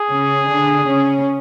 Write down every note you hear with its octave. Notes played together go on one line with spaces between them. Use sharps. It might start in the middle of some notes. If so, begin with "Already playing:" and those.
Already playing: G#4
C#3 C#4
D3 D4
C#3 C#4